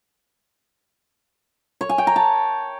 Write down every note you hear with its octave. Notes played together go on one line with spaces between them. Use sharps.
C#5
G#5
G5
A#5
A5